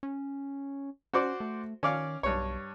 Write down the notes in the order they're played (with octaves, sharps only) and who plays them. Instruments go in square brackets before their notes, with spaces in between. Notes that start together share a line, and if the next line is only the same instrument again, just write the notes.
[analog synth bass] C#4
[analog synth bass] C#4 [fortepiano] F#4 C5 D5
[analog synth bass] A3
[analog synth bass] D#3 [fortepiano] C#4 D5 F5
[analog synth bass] B1 [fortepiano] G2 C#5